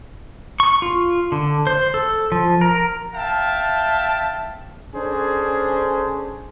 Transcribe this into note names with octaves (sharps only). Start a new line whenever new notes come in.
C#6
F4
D3
C5
A4
F3
A#4
E5 F5 G5 A5
C#4 D4 G#4 A4 C5